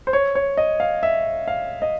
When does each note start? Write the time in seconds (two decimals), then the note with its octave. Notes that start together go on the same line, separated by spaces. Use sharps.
0.07 C5
0.13 C#5
0.35 C#5
0.57 D#5
0.80 F5
1.03 E5
1.48 F5
1.82 D#5